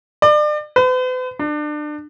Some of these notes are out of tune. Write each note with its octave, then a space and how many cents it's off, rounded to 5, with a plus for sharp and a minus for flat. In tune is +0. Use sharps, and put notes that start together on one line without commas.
D5 +35
B4 +45
D4 +30